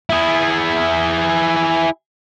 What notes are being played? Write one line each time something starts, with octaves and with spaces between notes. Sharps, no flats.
E4 G#4